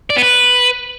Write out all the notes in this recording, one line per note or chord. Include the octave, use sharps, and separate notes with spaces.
D5
B3
B4